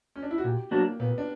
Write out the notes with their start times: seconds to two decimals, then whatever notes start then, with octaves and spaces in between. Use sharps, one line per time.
0.16 C#4
0.23 D4
0.31 E4
0.38 F#4
0.44 A#2 G4
0.71 F#3 A#3 B3 D4 F#4
1.00 A#2 B3
1.18 D4